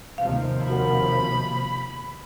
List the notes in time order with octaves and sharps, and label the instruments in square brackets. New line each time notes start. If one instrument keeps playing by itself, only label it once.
[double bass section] D#2 C3 F3 [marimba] F5
[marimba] F#4 A#4 F#5 [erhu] B5